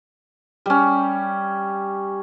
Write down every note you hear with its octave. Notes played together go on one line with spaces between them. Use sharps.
G3 C#4